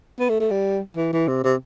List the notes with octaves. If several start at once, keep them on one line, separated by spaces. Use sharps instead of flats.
B3
A3
A3
G3
E3
E3
C3
C3